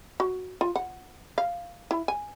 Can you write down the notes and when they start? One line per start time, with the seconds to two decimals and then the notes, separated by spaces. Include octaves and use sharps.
0.20 F#4
0.61 F4
0.76 F#5
1.38 F5
1.91 E4
2.08 G#5